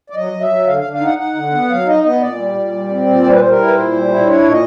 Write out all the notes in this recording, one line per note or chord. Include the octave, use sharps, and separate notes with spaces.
D5
F#3 D#5
F#3
E5
F#3
D3 F5
F5
D3
F5
D#4 F#5
D#4 F#5
D3
B3
F#3 F5
D#4 D#5
B3 D#5
A#2 D5
G3
A#2
G3
C4
A#2
G3 C5
B4
G3 C5
A#4
E4
B4
A#2 C5
G3
E4
D4 C#5
A#2
D#5